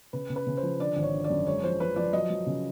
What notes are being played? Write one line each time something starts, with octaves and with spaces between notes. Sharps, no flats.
C#3 B4
C#3
B4
C#3
C5
F3
D3 D5
G#1
C#5
D3
D5
F#2
G#3 C#5
F3 C5
F3 B4
F3 D5
F#3 D#5
F#3
C#3